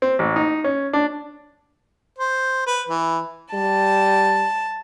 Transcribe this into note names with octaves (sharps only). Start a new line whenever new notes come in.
C4
A1
D#4
C#4
D4
C5
B4
E3
G3 A5